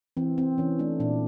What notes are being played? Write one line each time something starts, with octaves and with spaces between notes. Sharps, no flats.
E3 C4
C4
E3 C#4
A3 D4
A#2 D4